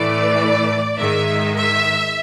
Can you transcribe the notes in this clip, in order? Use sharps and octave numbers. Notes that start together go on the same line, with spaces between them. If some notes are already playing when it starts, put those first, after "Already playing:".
Already playing: A2 E3 A3 D5
G#2 D#3 G#3 E5
E5